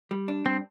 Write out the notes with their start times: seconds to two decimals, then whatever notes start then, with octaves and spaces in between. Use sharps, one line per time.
0.11 G3
0.28 D4
0.45 G2 C4